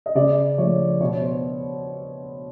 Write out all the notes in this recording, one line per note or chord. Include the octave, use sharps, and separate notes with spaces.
D#5
C#3 D5
F3 A3 C#5
B2 C#5
C5